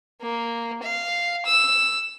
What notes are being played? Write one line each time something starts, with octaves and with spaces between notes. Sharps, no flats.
A#3
F5
E6